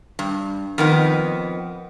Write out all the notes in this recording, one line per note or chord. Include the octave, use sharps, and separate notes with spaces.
G2
F2 D#3 B3